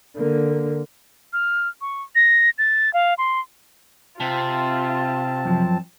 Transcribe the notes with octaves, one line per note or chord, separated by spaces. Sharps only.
D3 A#3
F6
C#6
A#6
A6
F5
C6
C3 C4 F4 A5
F#2 F3